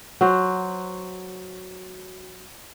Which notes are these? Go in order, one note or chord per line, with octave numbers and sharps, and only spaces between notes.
F#3 F#4 C5